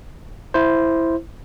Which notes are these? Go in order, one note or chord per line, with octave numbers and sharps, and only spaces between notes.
E4 C5